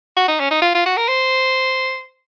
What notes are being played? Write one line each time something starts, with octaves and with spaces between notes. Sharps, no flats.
F#4
D#4
C#4
D#4
F4
F4
F#4
A#4
C5